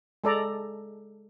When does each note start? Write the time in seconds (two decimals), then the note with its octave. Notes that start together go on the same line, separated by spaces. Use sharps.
0.24 G#3 A4 D5 A#5